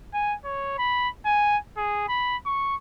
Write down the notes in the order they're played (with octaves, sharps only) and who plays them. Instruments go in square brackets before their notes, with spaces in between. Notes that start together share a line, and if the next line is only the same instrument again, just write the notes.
[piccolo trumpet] G#5
C#5
B5
G#5
G#4
B5
C#6